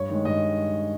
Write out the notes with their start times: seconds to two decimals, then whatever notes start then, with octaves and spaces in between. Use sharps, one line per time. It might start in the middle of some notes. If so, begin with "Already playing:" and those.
Already playing: G2 C#5
0.09 D#3 G#3
0.25 G2 D#5